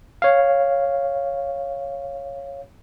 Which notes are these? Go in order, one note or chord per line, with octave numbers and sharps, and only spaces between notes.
C#5 F5